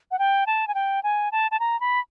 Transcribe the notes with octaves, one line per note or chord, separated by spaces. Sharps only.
F#5
G5
A5
G#5
G5
G#5
A5
A5
A#5
B5